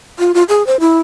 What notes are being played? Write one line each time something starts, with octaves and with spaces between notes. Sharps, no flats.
F4
F4
G#4
C5
E4